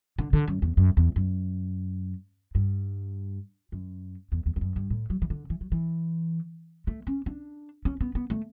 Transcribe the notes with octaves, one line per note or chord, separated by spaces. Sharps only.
D3
D3
F#2
E2
F#2
E2
F#2
G2
F#2
E2
E2
E2
F#2
G2
A2
F#3
E3
D3
E3
F#3
E3
A3
C#4
D4
C#4
B3
B3
A3